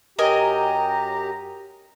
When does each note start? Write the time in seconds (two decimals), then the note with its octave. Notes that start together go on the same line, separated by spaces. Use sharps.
0.19 F#2 G4 A#4 D#5 G#5 A#5